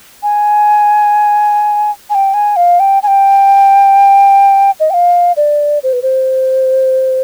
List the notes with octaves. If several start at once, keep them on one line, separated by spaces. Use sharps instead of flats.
G#5
G#5
G5
G#5
F5
G5
G#5
G5
D#5
G5
F5
D5
C5
B4
C5